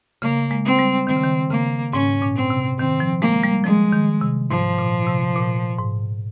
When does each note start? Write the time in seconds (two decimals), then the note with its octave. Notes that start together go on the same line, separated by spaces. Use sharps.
0.22 C#3 A#3
0.51 G#3
0.65 C4
0.79 G3
1.07 D#3 C4
1.16 C#3
1.24 D#3
1.51 C#3 A#3
1.93 G#2 C#4
2.22 A#2
2.36 C4
2.50 C3
2.79 D#3 C4
3.00 F3
3.21 G#3 A#3
3.44 G3
3.64 F3 G#3
3.93 D#3
4.21 C3
4.50 G#2 F3
4.78 A#2
5.07 C3
5.35 A#2
5.78 G#2